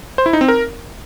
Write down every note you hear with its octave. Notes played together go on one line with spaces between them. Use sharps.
C5
E4
D#4
C4
A#4